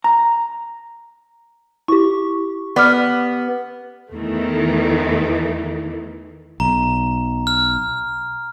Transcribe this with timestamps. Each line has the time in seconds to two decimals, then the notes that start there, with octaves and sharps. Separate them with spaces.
0.04 A#5
1.88 E4 G4 C#6
2.76 B3 D5 D6 F6
4.12 E2 D#3 E3 A3
6.60 B1 A#5
7.47 F6